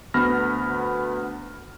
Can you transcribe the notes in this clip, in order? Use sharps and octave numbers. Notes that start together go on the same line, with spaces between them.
D2 B3 B5 F6 A#6